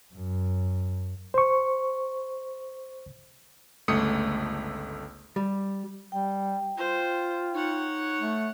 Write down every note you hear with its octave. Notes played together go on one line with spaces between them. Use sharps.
F#2
C5 C#6
G1 C#2 A3 D#6 C#7
G3
G3 G5
F4 C5
D#4 C#5 F#5
A3